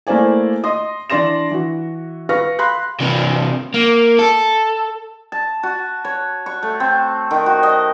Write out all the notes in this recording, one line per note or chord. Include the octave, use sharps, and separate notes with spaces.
A3 A#3 E4 C5 D5 G#5
D#5 C6 D#6
E3 D4 D5 C6 A#6 E7
E3 F#4
B4 F5 C#6 F6 A#6
F5 B5 C6 F#6
C3 E3
A#3
A4
A5
F#4
C#5
C#6
A3
C4
D#3
F#4
D#5